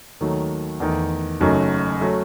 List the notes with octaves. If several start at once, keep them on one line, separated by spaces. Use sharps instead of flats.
D#2 D#3 F#3 A3
E2 D#3 A3
F#1 F#2 F#3 A3 D#4
F#3 A3